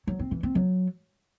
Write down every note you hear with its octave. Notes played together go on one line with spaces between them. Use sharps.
F#3
C4
E3
C4
F#3